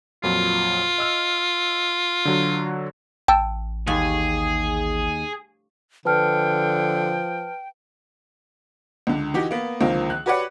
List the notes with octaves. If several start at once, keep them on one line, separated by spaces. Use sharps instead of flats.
F2 A#2 F#3 F4
D#5 E6 F6
D3 F#3 F#4
A1 G5 A5 E6
D#2 G#4
D3 F3 B4 G5 A5 F6
C#2 D3
E3 D#4 F#4 G4
A#3 B3
C#2 D3 D#3 F3 A#3 C4
F#6
F#4 G4 B4 C#5 D5 F#5